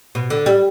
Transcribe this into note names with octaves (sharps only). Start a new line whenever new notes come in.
B2
D3
G3